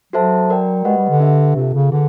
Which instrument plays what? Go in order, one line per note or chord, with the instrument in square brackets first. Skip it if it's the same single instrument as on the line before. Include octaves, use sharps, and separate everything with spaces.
[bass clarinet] F#3 [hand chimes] F#4 A4 C5 E5 A5
[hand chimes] F#4 A#4 D5 G5
[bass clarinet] G#3 [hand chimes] G4 B4 D#5 F#5
[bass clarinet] G3
D3
[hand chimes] D4 G4 B4 E5
[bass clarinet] C3 [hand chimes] C4 F4 A4
[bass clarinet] C#3
[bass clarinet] D3 [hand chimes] G#4 B4